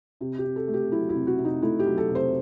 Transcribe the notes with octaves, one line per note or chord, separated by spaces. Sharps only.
C3 G4
G4
C3
A4
A3
G4
F#3 E4
E4
C3
F#4
C3
D#4
A3 E4
G4
F#3
A4
C3
C5